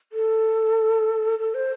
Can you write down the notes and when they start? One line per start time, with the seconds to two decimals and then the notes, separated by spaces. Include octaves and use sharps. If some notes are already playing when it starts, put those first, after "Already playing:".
0.13 A4
1.39 A4
1.54 C5